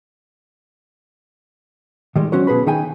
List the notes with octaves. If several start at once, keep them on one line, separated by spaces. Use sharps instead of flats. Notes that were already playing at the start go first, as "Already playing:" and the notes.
D#3 G3 G#3
F#3 C#4 F#4 C5 C#5
B2 G#4 B4 B5
D#3 D#4 G#4 G5 G#5